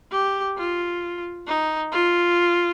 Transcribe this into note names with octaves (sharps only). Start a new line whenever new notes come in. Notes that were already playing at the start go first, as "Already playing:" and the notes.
G4
F4
D#4
F4